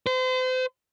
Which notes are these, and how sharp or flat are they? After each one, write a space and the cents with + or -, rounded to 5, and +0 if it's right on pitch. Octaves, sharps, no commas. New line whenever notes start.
C5 -35